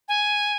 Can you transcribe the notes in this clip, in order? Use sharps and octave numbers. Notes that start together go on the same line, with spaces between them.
G#5